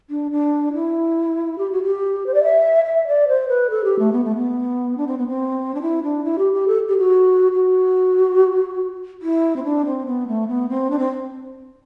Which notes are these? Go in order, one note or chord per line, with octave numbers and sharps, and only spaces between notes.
D4
D4
E4
G4
F#4
G4
C5
D5
E5
E5
D5
C5
B4
A4
G4
A3
B3
A3
B3
D4
C4
B3
C4
D4
E4
D4
E4
G4
G4
A4
G4
F#4
F#4
E4
C4
D4
C4
B3
A3
B3
C4
D4
C4